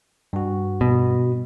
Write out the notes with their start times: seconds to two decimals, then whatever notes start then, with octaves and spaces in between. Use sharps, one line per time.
0.33 G2 F#4
0.81 B2